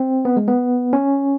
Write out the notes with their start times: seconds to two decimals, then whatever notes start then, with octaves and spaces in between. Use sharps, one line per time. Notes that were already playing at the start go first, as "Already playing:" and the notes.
Already playing: C4
0.25 B3
0.37 G#3
0.48 B3
0.93 C#4